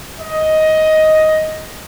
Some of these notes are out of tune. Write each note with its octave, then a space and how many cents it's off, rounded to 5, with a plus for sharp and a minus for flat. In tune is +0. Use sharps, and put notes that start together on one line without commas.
D#5 +10